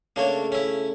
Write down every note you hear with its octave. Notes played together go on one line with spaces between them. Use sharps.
C#3 A3 A#3 D4 C#5
C#4 E4